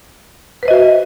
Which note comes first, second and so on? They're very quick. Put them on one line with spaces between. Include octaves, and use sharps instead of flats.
B4 C5 D#5 F#4 E5